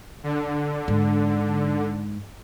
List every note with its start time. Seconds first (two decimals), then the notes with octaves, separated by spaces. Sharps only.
0.23 D3
0.88 G#2